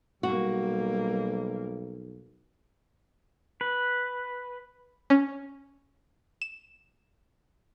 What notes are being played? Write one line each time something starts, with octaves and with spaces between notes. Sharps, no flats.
B1 G3 A#3 F#4
B4
C#4
E7